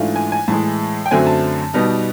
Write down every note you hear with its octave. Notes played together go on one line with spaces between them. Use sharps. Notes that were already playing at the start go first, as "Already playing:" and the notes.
Already playing: G#2 E3 A3 D4 F4
G#5
G#5
A2 E3 G#3 A5
G5
F#2 D3 F#3 A3 C4 G#5
A5
B2 G3 B3 D#4